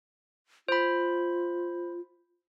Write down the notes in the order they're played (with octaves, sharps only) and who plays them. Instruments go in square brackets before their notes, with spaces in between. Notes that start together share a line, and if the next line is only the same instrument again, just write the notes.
[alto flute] F4 [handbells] C5 B5